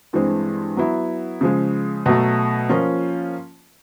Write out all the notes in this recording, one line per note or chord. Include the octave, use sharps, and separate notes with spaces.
G2 E3 G#3 C4
F#3 B3 E4
C#3 F3 G#3
B2 F#3 A3
F3 A#3 C#4 F4